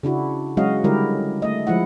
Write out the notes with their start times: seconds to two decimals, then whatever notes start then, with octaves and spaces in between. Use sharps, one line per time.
0.03 C#3 D4 E4 F#4
0.57 F#3 G#3 C#4 F#4 D#5 F5
0.84 D3 G3 G#3 E4 G4 A#4
1.42 A3 D#5
1.67 F3 G#3 E4 F#5